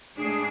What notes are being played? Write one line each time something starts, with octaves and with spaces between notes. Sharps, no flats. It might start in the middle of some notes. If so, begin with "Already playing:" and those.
A2 G#3 D4 G#4